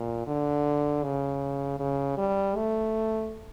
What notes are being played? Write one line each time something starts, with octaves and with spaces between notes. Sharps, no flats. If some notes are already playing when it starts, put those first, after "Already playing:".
Already playing: A#2
D3
C#3
C#3
G3
A3